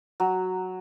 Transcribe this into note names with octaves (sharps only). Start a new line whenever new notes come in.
F#3